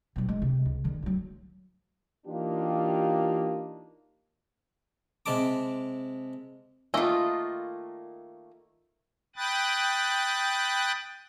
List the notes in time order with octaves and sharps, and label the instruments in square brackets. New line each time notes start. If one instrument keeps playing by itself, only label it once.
[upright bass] B2 F#3
G#3
C3
C#2
D3 D#3
D2 F#3
[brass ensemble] E3 A#3 D4 D#4 F4 G4
[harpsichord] C3 G#3 A5 D6
[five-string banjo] D#3 A3 A#3 [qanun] F4 D#5
[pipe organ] G5 B5 D#6 F#6 A6